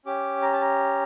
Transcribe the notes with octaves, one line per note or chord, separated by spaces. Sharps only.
C#4 G4 D6
A#5
A5
A#5